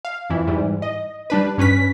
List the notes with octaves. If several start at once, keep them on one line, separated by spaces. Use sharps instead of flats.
F5
F2 E3
G#2 E3 G3
D#5
G3 D4 B4
G2 C#4 B4 B6